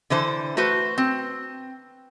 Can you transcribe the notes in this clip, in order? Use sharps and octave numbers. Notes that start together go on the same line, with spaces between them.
D3 E3 C5 A5
A3 F#4 B4 C5
C4